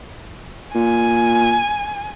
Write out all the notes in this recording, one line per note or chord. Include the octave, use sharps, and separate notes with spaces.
A#2 G#5